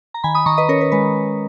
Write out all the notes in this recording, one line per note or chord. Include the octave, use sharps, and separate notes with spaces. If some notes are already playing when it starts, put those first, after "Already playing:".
A#5
D#3 G#5 B5
B5 D#6
D#3 A#5 C#6
B4 D#5
C#4 A#4 C#5
B4
G#3 B4